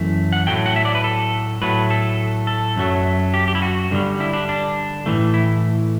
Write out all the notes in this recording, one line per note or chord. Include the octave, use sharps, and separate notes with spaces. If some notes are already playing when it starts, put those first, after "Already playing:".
Already playing: F#2 E3 A3
F#5
A2 F#3 A3 G5
F#5
E5
D5
B4
A4
A2 F#3 A3 B4
A4
A4
F#2 F#3 A3
G4
G4
E4
F#4
G2 D3 G3
E4
D4
D4
A2 E3 A3
E4